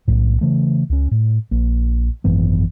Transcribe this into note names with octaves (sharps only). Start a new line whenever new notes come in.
B1 A2
C#3 E3 A3
C#2 C#4
A2
A#1 A#3
G#1 F#2 E3 B3